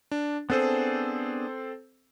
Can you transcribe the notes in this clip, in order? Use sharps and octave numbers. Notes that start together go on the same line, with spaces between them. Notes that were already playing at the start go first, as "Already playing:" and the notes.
D4
B3 C4 D4 G#4 A4 C5